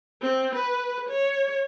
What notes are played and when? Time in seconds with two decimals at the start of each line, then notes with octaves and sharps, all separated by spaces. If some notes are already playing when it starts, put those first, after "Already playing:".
0.22 C4
0.55 B4
1.09 C#5